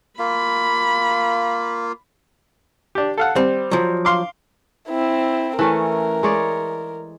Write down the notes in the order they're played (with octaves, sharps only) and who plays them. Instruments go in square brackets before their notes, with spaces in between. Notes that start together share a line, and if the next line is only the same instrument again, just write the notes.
[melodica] A#3 F4 [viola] B5
[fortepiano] D4 G4
A4 F5 F#5
[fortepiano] G3 [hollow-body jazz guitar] C4
[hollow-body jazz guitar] F3 F#3
[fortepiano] F5 C6 D6
[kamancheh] C4 E4
[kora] E3 A3 C#4 [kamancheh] A#4
[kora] G#3 C#5 D5